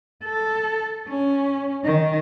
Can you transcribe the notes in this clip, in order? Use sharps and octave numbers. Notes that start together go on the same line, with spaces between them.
A4
C#4
D#3